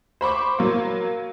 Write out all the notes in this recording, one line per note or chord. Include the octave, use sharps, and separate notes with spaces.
C5 B5 C#6 D6
F#3 A#3